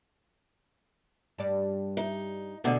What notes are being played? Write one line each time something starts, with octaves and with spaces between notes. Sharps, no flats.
G2 G3 D5
D#4
B2 D3 G3 A3 G#4